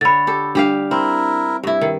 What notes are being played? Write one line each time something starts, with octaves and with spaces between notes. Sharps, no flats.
D3 C#5 B5 A6
G4 A4
G3 D4 G4 F5
C4 E4 A#4
G2 E4
D#3